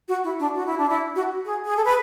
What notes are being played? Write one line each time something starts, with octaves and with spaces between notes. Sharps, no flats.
F#4
E4
D4
F#4
E4
D4
E4
F#4
G#4
G#4
A4
B4